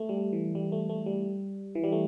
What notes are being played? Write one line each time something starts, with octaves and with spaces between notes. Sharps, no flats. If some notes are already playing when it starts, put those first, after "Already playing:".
Already playing: A3
G3
E3
G3
A3
A3
G3
E3
G3
A3